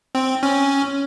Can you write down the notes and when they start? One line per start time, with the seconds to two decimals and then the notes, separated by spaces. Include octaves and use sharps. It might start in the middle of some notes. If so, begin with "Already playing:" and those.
0.15 C4
0.43 C#4